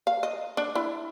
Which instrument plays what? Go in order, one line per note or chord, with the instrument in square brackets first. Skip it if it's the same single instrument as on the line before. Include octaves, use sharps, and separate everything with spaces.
[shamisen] F5
D#5
D4
E4